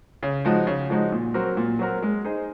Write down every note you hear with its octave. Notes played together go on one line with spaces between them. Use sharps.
C#3
F3 G#3 D#4 F#4
C#3
F3 G#3 D#4 F#4
A#2
F#3 C4 F#4 A#4
A#2
F#3 C4 F#4 A#4
G#3
D#4 G#4 C5